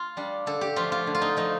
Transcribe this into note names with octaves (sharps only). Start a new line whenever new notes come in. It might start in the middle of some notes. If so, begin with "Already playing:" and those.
Already playing: F4
G3 D4
D3 A4
G4
F3 A3 F4
F4
D3
F4
D#4
F3 A3 D#4